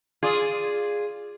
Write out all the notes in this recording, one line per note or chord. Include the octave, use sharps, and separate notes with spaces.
F4 G#4 D5